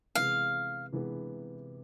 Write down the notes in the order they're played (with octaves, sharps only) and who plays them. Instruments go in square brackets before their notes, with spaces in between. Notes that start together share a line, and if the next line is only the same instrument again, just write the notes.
[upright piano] C3 E3 G#3 B3 [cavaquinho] F5
[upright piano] C3 E3 G#3 B3